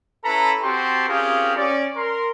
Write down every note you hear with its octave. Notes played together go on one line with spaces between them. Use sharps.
C#4 E4 A4 B4 A#5 B5
C4 F#4 G4 A5 C6
C4 C#4 F4 G4 G#4 A#4
C#4 D5
A#4 C6